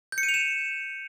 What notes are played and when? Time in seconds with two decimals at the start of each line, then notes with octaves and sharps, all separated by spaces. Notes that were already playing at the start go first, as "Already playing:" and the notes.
0.12 G6
0.18 C#7
0.23 D#7
0.29 F7
0.34 E7